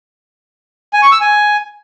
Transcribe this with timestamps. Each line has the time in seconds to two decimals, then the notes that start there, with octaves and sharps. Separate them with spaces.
0.93 G#5
1.03 C#6
1.12 E6
1.21 G#5